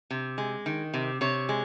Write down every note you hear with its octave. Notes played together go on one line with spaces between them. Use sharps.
C3
G#3
D#3
C3
C3 C#5
G#3